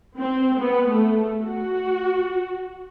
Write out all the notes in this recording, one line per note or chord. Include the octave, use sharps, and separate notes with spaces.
C4
B3
A3
F#4